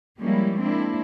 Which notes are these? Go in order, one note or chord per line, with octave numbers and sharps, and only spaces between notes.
F3 G3 G#3 A#3 C#4 E4
G#3 A#3 C4 D4 E4